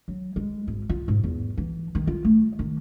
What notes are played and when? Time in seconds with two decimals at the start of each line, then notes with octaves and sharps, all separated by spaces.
0.08 F#3
0.36 G#3
0.67 G#1
0.89 F4
1.08 G#2
1.23 E2
1.57 E3
1.95 D#3
2.07 F4
2.25 A3
2.59 D#3